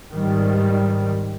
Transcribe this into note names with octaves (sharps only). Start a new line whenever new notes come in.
G#2 D#3 G3